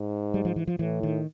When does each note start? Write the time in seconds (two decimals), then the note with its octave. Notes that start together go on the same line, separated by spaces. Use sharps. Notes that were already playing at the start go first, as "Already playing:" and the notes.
Already playing: G#2
0.34 G3
0.45 F3
0.56 E3
0.67 F3
0.79 A2 E3
1.03 D#3